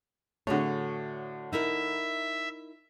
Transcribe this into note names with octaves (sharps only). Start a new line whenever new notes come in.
A2 D3 F#4 G#4 C#5
D#4 E4 A#4 E5